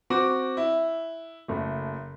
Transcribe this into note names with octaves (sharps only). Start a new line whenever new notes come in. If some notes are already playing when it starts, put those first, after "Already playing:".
C4 F#4 D6
E4
F#1 A3